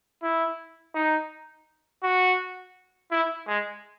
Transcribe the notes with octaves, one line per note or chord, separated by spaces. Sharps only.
E4
D#4
F#4
E4
G#3